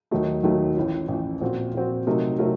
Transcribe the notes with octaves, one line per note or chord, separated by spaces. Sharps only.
D#2 D#3 F#3 A3 D#4
D#2 D#3 F#3 A3 D#4
A1 A2 F3
A1 A2 F3
A#2 F3 C4 F#4
A#2 F3 C4 F#4
C3 F#3 A3 D#4 A#4
C3 F#3 A3 D#4 A#4